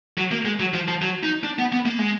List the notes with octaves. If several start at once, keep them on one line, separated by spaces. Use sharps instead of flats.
F#3
A#3
G#3
F#3
F3
F3
F#3
D#4
D4
B3
B3
A#3
G#3